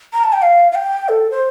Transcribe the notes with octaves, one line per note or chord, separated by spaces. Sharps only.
A#5
A5
G5
F5
F5
G5
A4
C5